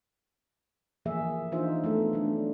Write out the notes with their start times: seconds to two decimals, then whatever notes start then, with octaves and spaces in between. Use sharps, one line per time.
1.05 E3 F3 A#3 G#4 E5
1.52 E3 D4 D#4 F4 C5 E5
1.84 A3 B3 A4
2.13 F#3 D4